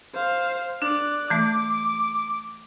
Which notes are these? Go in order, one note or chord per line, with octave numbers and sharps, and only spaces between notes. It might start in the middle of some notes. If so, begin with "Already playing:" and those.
C5 F5
D4 D5 F#6
E3 A3 D6